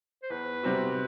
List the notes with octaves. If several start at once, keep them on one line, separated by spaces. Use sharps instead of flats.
C5
E2 B4
C3 G3 C4 F#4